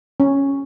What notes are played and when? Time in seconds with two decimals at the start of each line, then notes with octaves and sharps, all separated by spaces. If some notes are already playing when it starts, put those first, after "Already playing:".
0.20 C#4